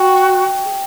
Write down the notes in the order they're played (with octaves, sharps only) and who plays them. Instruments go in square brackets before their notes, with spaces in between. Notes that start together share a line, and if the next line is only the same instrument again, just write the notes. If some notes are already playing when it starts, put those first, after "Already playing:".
Already playing: [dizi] F#4 [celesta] G5
[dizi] G#4